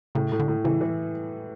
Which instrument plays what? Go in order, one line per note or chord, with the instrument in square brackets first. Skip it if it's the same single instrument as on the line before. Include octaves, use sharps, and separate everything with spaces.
[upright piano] A2 [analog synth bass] C#3
[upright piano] A2
[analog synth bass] D3
[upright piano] A2
[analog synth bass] C#3 [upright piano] E3
[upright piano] E3